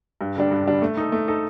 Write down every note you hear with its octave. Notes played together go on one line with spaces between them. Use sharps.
G2
D3 G3 D4
G2
D3 G3 D4
A3
D#4 A4
A3
D#4 A4